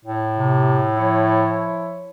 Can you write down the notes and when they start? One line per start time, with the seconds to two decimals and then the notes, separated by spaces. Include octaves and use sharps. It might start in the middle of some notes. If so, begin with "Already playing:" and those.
0.05 A2
0.38 C3
0.96 F3 E4 C#5